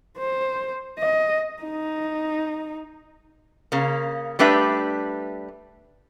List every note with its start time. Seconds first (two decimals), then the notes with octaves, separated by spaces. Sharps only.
0.18 C5
0.99 D#5
1.63 D#4
3.72 C#3 A#3
4.39 G3 A3 D4 B4 E5